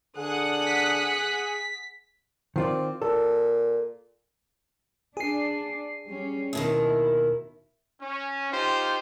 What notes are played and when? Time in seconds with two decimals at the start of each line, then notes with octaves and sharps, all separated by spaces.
0.17 D3 G#4 F#5 D#6 F#6
0.66 B6
2.56 D#3 C4 F4 D5
3.02 A#2 A4
5.17 D4 G#4 C7
6.07 G3 C#4
6.53 D#2 B2 D#3 E4
8.02 C#4
8.52 D#4 F4 G4 C5